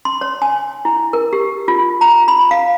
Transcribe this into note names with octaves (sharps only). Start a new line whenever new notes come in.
C6
C#5
G#5
E4
A#4
G4
F4
A#5
B5
F5